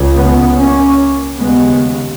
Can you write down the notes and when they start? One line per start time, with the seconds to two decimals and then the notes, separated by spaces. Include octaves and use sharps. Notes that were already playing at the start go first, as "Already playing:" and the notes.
Already playing: C#2 C#3
0.17 G#3 B3
0.59 A#3 C#4
1.40 D#2 C#3 G#3 B3